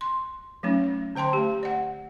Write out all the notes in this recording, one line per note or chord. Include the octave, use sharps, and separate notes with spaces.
C6
F#3 A3 C#4 D#4
D3 C5 G5 A5 C6
A3 G4
D5 F#5